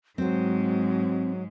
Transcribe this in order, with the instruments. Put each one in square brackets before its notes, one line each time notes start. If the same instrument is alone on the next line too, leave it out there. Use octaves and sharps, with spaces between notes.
[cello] G#2 G#3 [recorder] F#3 [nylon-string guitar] C4 C5